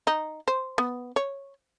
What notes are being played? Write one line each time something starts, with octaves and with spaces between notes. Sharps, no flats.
D#4
C5
B3
C#5